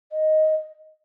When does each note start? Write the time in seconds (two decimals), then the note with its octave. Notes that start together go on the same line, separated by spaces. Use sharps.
0.11 D#5